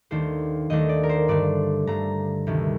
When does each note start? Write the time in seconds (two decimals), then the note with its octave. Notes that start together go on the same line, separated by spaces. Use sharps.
0.11 D#2 D#3 A3 D4 C5
0.70 D#2 D#3 A3 D4 D#5
0.89 D5
1.03 A#4
1.09 C5
1.28 G2 D3 A3 D4 D5
1.87 G2 D3 A3 D4 A#5
2.47 D2 C3 D#3 G3